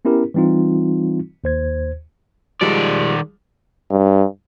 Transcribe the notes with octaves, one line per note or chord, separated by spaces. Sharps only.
B3 C#4 E4 G4 A#4
E3 G3 C4 D#4 F4
D#2 C5 G#6
D#3 F3 G3 G#3 D5
G2